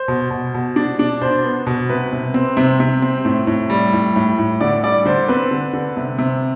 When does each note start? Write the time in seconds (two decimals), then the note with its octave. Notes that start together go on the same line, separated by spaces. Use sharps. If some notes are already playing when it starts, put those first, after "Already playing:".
Already playing: C5
0.08 B2
0.31 B2
0.54 B2
0.76 D4
0.99 D4
1.21 B2 C5
1.44 B3
1.67 B2
1.89 C3 B4
2.13 C3
2.34 C4
2.57 C3
2.80 C3
3.02 C4
3.25 A2
3.47 A2
3.70 G3
3.93 A2
4.16 A2
4.39 A2
4.61 D3 D5
4.84 G3 D5
5.05 D3 C5
5.28 C4 B4
5.51 D3
5.73 D3
5.97 C3
6.18 C3